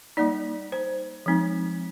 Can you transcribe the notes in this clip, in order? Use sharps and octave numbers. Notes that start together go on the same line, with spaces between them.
G3 A#3 D#4 D5
C5
F3 G#3 C4 D#4